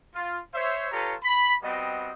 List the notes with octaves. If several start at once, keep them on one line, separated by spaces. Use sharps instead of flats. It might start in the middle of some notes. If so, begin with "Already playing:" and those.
F4
C5 C#5 E5
F4 G4 A4 B4 C#5 A#5
B5
G3 B3 C4 F#4 D#5